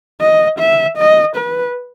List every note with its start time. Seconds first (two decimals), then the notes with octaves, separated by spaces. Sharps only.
0.21 D#5
0.60 E5
0.98 D#5
1.37 B4